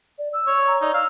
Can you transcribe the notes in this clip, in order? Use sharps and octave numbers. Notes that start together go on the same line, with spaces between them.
D5
E6
C#5
A#5
D#4 D5
F5 E6